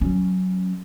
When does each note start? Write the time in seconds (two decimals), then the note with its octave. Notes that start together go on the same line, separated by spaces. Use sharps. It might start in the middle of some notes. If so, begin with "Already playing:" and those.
0.01 F#3 C#4